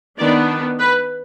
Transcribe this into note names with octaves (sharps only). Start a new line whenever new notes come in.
D#3 B3 D4 D5
B4